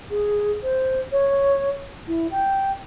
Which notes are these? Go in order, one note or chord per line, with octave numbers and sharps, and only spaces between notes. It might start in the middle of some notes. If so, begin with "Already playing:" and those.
G#4
C5
C#5
E4
G5